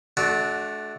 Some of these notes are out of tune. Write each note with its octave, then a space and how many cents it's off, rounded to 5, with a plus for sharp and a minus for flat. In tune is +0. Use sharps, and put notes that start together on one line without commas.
A3 -30 D4 +0 F#4 +0